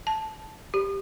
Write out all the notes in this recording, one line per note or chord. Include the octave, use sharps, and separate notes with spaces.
A5
G4